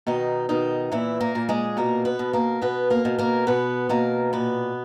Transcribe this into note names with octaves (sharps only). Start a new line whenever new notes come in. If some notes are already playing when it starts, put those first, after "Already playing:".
B2 D#3 D#4
B2 D#3 D#4
A#2 E3 E4
A#3 A#4
A#2
G#3 G#4
B2 A#3 A#4
B3 B4
B2
A#3 A#4
B2 B3 B4
A#3 A#4
B2
A#3 A#4
B2 B3 B4
B2 A#3 A#4
A#2 B3 B4